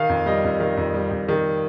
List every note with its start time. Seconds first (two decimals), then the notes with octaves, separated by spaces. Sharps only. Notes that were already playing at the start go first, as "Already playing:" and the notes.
Already playing: D#3 F5
0.09 F2
0.26 G3 D#5
0.44 F2
0.60 D#3 F5
0.77 F2
0.94 G3
1.11 F2
1.29 D#3